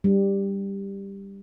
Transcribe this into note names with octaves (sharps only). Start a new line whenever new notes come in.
G3